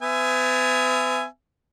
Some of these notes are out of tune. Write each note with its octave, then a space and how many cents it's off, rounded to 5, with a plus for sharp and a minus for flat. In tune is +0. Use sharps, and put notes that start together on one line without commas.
B3 +45 E5 +20 G#5 +0